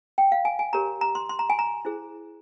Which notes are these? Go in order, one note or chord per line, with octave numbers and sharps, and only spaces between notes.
G5
F5
G#5
G#5
G4 A#4 C#5 A#5
A#5
C6
C6
A#5
G#5
A#5
E4 G#4 C5